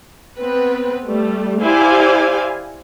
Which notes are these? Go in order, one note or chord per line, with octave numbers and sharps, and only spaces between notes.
B3 C4 B4
G3 A3
E4 G4 C5 D5 F5 G#5